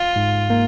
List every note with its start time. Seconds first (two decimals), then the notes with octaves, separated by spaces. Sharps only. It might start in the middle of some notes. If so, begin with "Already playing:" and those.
Already playing: F4
0.16 G#2
0.50 A#3